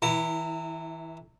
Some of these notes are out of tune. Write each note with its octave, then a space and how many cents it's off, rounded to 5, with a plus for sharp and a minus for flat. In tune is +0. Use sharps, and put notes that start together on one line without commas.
E3 -30 E4 +0 A#5 -35